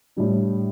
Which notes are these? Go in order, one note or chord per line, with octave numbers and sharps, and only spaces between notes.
A2 G3 D4